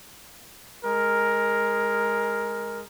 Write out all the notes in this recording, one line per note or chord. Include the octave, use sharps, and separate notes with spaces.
G#3 A#4